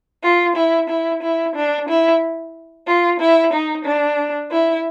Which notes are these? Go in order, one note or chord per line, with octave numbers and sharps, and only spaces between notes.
F4
E4
E4
E4
D4
E4
F4
E4
D#4
D4
E4